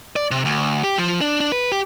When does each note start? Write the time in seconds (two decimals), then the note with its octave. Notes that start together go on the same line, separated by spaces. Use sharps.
0.16 D5
0.31 C3
0.45 D2
0.83 G4
0.98 F3
1.21 D4
1.40 D4
1.52 B4
1.72 G4